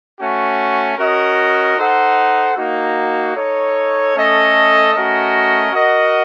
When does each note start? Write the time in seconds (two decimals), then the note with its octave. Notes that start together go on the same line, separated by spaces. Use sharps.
0.18 A3 C#4 F#4
0.97 C#4 F#4 A#4 D#5
1.77 D#4 A4 C5 F#5
2.56 A#3 D#4 F#4
3.35 D#4 A4 C#5
4.15 A3 C#4 A4 D#5
4.94 A3 C#4 F#4 A#4 D#5
5.72 F#4 A#4 D#5 F#5